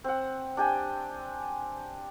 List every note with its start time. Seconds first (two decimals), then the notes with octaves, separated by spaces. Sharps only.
0.04 C4 F#5
0.57 D4 G4 G5 G#5